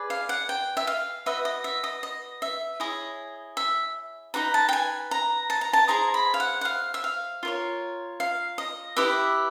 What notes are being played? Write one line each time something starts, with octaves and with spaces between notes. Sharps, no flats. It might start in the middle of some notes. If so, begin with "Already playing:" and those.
Already playing: G#4 B4 D5
F5
F#5
G5
E5
F5
F#4 B4 D#5 E5
D#5
E5
D#5
D#5
E5
E4 G#4 C#5 D#5
E5
D#4 F#4 B4 A#5
A5
G5
G#5
A#5
A5
A#5
A5
E4 G#4 C5 A#5
B5
F5
F#5
F#5
F5
E5
F5
F4 A#4 C#5
F5
D#5
E4 G4 B4 D#5 E5